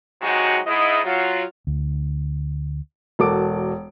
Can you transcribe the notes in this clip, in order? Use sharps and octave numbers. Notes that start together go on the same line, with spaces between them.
C3 F#3 G#3 D#4 F#4
G#2 E4 D#5
F#3 F4
D2
E1 F#4 A4 A#4 D6 D7